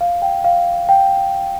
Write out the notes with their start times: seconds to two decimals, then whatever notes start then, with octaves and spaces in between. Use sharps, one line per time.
0.01 F5
0.22 G5
0.44 F5
0.89 G5